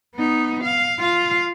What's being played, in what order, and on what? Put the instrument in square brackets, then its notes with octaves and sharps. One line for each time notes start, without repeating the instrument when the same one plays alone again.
[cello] B3 D#4
F5
F4 F5